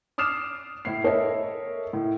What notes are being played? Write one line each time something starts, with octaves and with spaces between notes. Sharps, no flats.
D6 D#6 F6 C7 E7
A2 E4 C7
A4 A#4 C#5 D#5 E5
A2